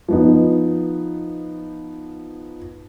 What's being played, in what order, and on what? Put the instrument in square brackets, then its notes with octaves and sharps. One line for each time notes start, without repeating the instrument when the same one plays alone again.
[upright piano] F3 B3 D#4